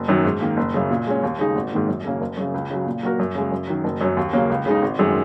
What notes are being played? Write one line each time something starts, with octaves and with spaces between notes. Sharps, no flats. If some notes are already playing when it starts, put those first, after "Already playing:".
Already playing: F#1
F#2 D#3 F#3
G#2
D#3 A#3
F#1
F#2 C#3
A#2
G#3 C#4
D#2
C#3 G#3 D#4 G#4
G#1
G#2 D#3 A#3
F#2
C#3 A#3 C#4
F#1
F#2 C#3
C#2
C#3 F#3
A#2
F#3 A#3 F#4 A#4
F#2
C#3 G#3
F#2
D#3 F#3
F#1
F#2 F#3 C#4
D#2
C#3 F#3 A#3 C#4
C#2
C#3 G#3 D#4
G#1
F#2 D#3 G#3